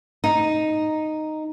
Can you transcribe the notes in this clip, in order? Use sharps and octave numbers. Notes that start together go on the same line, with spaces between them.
D#4